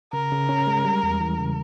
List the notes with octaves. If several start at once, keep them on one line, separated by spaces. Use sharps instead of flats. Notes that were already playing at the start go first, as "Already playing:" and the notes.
C#3 A#4
C#3
C#4
G#3
G3
E2
E3
C#3